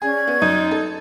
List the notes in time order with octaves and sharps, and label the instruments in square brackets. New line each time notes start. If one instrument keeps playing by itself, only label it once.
[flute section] C#4 D5 G#6 [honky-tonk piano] G#4
[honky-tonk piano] B3
[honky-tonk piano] F#2 [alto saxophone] D#4
[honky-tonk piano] A4